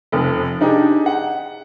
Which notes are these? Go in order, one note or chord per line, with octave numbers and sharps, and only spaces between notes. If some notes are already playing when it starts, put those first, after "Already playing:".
F1 F2
D4 D#4 G4 G#4
F#5